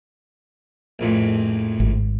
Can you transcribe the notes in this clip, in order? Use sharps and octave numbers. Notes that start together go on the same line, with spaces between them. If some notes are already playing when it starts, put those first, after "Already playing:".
A#1 F2 A2
G#1